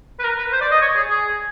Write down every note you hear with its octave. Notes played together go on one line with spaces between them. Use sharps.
B4
A#4
B4
C5
D5
D#5
C#5
G#4
G#4